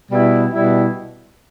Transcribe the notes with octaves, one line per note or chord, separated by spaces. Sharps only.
B2 G3 E4
B2 G3 E4